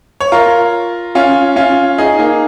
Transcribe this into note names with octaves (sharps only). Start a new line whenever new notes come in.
C#5
F4 A#4
C#4 F4
C#4 F4
D#4 G#4
A#3 D#4